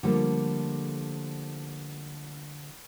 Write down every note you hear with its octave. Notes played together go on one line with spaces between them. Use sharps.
D3 F3 G3 A3 A#3